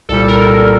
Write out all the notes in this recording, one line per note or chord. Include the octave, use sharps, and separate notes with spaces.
C2 A#2 G3 A4
A#4